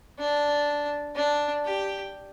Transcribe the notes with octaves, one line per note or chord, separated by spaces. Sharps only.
D4
D4
G4